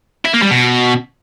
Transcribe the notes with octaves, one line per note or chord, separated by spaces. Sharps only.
E4
A#3
G3
B2